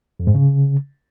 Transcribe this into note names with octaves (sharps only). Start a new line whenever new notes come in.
F2
G#2
C#3